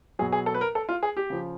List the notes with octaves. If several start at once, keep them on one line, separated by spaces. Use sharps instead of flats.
B2 F#3 G#4
G#4
A4
B4
A#4
A4
F4
G#4
G4
C#3 F3